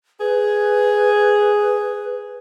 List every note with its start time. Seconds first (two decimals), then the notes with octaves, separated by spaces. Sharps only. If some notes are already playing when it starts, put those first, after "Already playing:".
0.20 G#4 B4